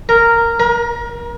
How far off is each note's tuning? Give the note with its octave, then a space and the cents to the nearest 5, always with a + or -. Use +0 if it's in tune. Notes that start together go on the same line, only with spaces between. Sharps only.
A#4 -10
A#4 +30